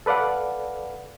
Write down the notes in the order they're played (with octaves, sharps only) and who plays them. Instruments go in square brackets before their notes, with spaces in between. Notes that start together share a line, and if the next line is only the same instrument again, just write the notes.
[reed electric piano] A4 B4 D5 F5 F#5